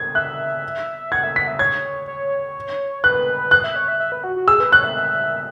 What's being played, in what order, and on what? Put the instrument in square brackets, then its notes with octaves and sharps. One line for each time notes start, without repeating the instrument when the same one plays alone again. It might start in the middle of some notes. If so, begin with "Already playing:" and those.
Already playing: [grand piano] G#6
[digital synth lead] E5 [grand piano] F#6
[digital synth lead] F#5 [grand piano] G#6
[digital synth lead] E5
[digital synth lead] F#5 [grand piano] B6
[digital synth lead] E5
[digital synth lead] C#5 [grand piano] G#6
[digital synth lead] C#5
[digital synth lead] B4 [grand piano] F#6
[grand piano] F#6
[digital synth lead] E5
C#5
E5
E5
B4
F#4
F#4
[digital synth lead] G#4 [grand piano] E6
[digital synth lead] B4
[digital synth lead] C#5 [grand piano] F#6
[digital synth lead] E5
E5